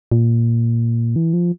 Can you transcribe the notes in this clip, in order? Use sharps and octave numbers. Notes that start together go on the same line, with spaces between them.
A#2
E3
F3